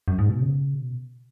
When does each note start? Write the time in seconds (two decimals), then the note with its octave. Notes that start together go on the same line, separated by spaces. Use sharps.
0.08 F#2
0.19 G#2
0.29 B2
0.41 C#3
0.74 B2